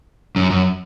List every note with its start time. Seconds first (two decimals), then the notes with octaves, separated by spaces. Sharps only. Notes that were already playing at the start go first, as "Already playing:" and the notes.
0.36 F#2
0.51 F#2